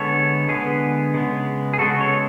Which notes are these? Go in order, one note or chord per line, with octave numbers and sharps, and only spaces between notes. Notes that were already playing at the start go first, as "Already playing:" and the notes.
Already playing: D3 G#3 B3 A4 C#5
D3 G#3 B3 G#4 B4
C#3 G#3 B3
G#4
C#3 G#3 B3 F#4 A4
A4 C#5